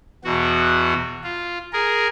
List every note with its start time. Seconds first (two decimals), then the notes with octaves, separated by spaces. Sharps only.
0.24 E2 B2 F#4
1.24 F4
1.73 G#4 A#4